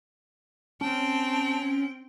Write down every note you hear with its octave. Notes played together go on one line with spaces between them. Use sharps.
C4 C#4 G5 A5